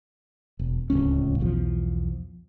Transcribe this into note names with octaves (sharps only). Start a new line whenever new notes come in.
E1
D1 G#1 C#2 C#4
B1 E2 F3